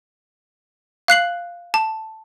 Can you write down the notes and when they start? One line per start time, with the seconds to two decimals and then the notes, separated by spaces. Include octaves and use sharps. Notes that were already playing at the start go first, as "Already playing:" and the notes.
1.08 F5 F#6 C7 F#7
1.74 A5